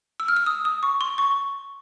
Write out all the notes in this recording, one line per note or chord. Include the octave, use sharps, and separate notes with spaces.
E6
F6
E6
D#6
D#6
C#6
C6
C#6